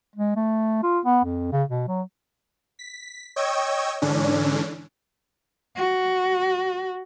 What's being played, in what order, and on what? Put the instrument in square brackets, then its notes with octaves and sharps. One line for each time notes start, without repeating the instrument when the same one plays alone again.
[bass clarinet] G#3
A3
F4
B3
F2
C#3
B2
F#3
[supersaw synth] B6
C#5 D#5 G5 C#6 E6 G#6
G#2 D3 E3 C#4 D4
[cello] F#4